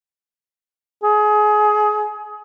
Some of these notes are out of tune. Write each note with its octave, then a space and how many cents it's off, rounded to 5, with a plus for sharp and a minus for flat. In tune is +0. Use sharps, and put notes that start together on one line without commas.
G#4 +25